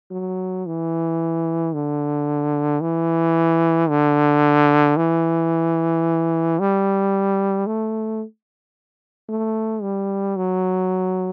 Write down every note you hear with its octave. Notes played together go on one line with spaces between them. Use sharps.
F#3
E3
D3
E3
D3
E3
G3
A3
A3
G3
F#3